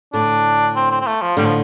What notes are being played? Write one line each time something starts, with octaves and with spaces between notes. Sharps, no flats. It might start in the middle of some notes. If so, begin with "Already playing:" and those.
A2 D3 D4
C4
C4
C4
A3
F3
A2 D3 G3
F3